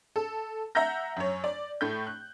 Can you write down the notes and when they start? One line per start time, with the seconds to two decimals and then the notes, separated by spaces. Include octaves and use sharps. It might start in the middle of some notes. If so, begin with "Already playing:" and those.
0.16 A4
0.75 E5 F#5 A#5 G6 A#6
1.17 F#2 C#5
1.44 D5
1.81 A2 A3 G6
2.07 F#6